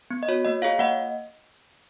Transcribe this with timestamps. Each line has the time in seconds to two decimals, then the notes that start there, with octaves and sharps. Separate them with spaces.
0.10 B3
0.23 D#5
0.28 F#4 C#5
0.45 A#3 D#5
0.62 F4 G#4 C#5 F5
0.79 A#3 D#5 F#5